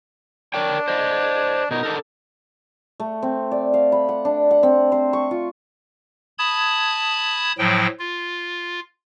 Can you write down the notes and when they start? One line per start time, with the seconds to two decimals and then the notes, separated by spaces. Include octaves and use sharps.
0.54 D4 A#4 C#5 G5
0.88 C5 D#5
1.71 B2 D#4 A#4
1.83 D4 A4 A#4
3.00 A3
3.22 C4
3.51 D5
3.74 F5
3.92 B5
4.09 F#5
4.25 D4
4.51 F#5
4.63 C4
4.92 C5
5.13 C#6
5.31 F4
6.38 A5 B5 D#6 G#6
7.58 A2 F3 F#3 G5
7.99 F4